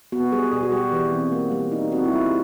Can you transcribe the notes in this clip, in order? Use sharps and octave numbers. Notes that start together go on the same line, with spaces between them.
B3 F#4
G3 G#4
B2 G#4
F#4
G3 G4
E3
C4
A#3
G3
D#4
C4 F#4
E4
G3 F4